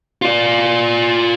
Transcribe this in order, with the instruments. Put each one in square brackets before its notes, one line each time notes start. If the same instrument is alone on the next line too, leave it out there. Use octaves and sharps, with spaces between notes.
[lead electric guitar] F4 D5